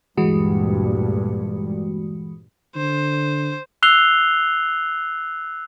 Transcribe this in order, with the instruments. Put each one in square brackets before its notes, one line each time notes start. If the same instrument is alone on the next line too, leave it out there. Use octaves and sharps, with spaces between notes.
[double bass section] D2 G2 A#2 [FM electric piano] E3 G#3 F#4
[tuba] D3 [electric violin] C5
[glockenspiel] E6 F#6 C7 F7 G7